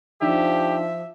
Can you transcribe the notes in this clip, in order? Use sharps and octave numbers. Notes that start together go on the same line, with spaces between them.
F3 D4 D#4 G4 E5